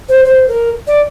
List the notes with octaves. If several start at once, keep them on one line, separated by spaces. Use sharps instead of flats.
C5
C5
A#4
D5